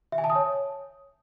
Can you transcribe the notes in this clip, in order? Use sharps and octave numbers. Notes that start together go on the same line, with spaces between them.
E5
G#5
A5
D#6
C#5